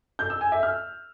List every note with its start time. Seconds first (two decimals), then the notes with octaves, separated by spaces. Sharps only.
0.19 G6
0.30 E6
0.41 G#5
0.52 E5
0.63 F6